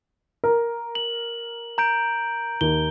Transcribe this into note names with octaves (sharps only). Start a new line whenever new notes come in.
A#4
F#7
A#5 G6 D7
D#2 G7